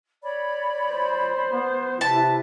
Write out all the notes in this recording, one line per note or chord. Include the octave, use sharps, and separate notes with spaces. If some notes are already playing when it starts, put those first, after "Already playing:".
C#5 D5 B5
C5
B3
C3 E4 B4 A5